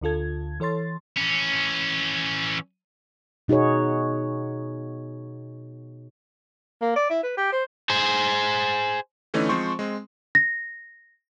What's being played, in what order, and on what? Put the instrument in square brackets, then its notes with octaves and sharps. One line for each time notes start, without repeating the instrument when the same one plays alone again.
[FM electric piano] D2 D3 F4 A4 G#6
E3 A4 C#5 C6 A6
[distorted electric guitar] E3 C#4
[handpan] B2 D#4 F#4 G#4 C#5
[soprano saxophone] A#3
D5
E4
B4
G4
C5
[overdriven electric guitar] G#4 C5
[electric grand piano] D3 E3 A3 C#4 D#4
F3 G#3 C4 C5 C6 C#6
G#3 C4
[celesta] A#6